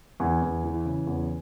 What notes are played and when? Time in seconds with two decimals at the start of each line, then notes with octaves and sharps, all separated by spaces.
0.20 E2 G#5
0.42 E2
0.64 E3
0.85 C#3
1.07 E2